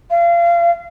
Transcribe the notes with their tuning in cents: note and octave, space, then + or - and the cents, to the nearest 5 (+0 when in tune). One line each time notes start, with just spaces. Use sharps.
F5 -30